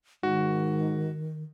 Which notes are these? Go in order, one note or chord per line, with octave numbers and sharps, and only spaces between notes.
G#2 D#3 F#4